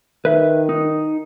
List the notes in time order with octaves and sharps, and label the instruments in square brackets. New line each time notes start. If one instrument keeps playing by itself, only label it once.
[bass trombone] D#3 [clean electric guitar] B4 E5
[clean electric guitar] D#4